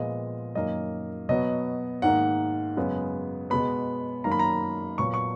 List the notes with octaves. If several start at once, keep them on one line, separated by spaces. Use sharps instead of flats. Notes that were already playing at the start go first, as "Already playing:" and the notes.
Already playing: A#2 F3 G#3 B3 D#5
F#2 D#3 A#3 D#5
B2 F#3 B3 D#5
G#2 D#3 A#3 F#5
F#2 C#3 G#3 B3
B2 G#3 B3 B5
F#2 D#3 A#3 A#5
B5
A#5
A#2 F#3 B3 C#6
C#6